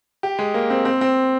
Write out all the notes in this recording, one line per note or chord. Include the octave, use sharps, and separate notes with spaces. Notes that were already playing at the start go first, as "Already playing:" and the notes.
G4
G#3
A#3
C4
C4
C4